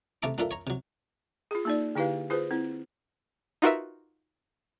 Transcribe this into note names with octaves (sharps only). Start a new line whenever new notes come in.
C3 A3 E5 A5 A#5 D6
A#3 D4 F4 A4 A#4 E5
C#5 A#5
C3 F#3
F4 G#4
A#3 D#4 D5
D3 E4 G4 B4 F5
F4 G#4 B4 C5
C4 E4
D#4 F4 F#4 A#4 B4 E5